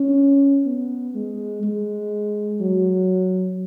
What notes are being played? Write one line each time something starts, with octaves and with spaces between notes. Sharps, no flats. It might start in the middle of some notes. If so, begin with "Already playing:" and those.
Already playing: C#4
B3
G#3
G#3
F#3